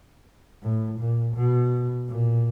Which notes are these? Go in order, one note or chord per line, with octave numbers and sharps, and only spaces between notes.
A2
A#2
B2
A#2